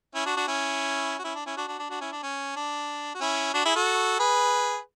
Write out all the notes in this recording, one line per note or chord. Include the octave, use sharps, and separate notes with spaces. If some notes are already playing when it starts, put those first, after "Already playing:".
C#4 E4
D4 F#4
D4 F#4
C#4 E4
F#4
C#4 E4
D4
C#4 E4
D4 F#4
D4 F#4
D4
D4 F#4
C#4 E4
D4
C#4
D4
F#4
C#4 E4
D4 F#4
E4 G#4
F#4 A4
G#4 B4